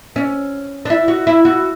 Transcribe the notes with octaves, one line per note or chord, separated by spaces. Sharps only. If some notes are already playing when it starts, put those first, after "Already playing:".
C#4
D4
E4
F#4
E4
F#4